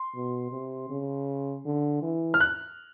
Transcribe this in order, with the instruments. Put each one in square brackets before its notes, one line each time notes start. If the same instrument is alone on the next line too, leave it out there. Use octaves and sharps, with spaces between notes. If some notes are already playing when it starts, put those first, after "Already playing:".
Already playing: [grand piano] C6
[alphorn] B2
C3
C#3
D3
E3
[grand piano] F6
F#6